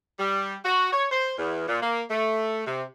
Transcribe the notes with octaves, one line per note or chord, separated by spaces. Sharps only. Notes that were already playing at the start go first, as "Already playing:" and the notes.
G3
F#4
C#5
C5
E2
A#2
A#3
A3
C3